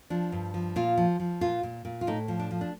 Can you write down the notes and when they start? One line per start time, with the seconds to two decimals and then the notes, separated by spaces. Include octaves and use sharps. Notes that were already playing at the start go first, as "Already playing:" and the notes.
0.10 F3 D4
0.32 G2
0.54 F3
0.76 A#2 F4
0.97 F3
1.20 F3
1.41 A#2 F4
1.63 A#2
1.85 A#2
2.01 F4
2.07 A2 D#4
2.28 F3
2.39 D4
2.51 F3
2.61 D4